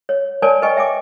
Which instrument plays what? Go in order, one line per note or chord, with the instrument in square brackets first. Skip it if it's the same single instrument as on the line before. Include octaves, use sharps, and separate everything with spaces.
[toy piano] C#5
A#4 B4 C#5 D5 G#5 A5
B4 D#5 G5 G#5 C#6
E5 G5 G#5 D6